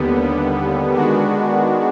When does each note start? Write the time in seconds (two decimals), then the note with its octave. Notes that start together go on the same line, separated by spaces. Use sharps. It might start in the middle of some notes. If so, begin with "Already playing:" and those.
Already playing: D#2 D3 G3 B3
0.94 D#3 G#3 B3 D4 F#4